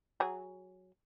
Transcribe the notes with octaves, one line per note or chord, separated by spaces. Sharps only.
F#3 G#4